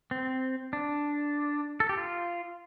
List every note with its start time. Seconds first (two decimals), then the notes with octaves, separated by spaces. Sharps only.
0.11 C4
0.73 D4
1.80 A4
1.89 G4
1.97 F4